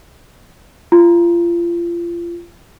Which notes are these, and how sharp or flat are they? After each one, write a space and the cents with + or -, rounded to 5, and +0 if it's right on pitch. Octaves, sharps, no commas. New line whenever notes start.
F4 -30